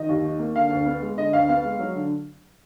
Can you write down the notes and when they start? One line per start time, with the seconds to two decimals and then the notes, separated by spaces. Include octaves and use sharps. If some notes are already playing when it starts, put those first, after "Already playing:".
Already playing: D#3 D#5
0.09 D#2
0.24 D#4
0.39 A#3
0.56 D3 F5
0.70 D2
0.86 B3
1.02 G#3
1.17 D3 D#5
1.33 D2 F5
1.48 B3 F5
1.64 G#3
1.79 F#3
1.95 D3